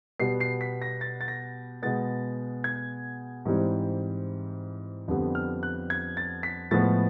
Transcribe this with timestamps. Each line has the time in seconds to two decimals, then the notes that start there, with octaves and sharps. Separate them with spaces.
0.19 B2 G3 B3 C7
0.40 C7
0.61 B6
0.82 A#6
1.01 A6
1.21 A6
1.28 A#6
1.82 B2 G#3 B3 A6
2.64 G#6
3.45 G#2 E3 G3 C4
5.08 F2 D3 G3 B3
5.35 F6
5.63 F#6
5.90 G#6
6.17 A6
6.43 B6
6.71 A2 F3 G#3 B3 A6